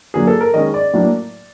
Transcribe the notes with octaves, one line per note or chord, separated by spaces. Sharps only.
D3 F#3 A#3 G#4
A4
A#4
D#3 G#3 C#4 D#5
D5
A2 F#3 A#3 D4